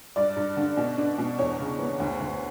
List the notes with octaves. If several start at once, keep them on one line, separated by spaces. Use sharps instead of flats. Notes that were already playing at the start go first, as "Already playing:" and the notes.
G2 D5
G2
D3
B2
D4
B2
E2 C#5
C#3
B3
D2
D2